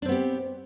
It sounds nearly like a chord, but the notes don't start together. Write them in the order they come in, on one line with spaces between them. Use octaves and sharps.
D4 C4 B3 G4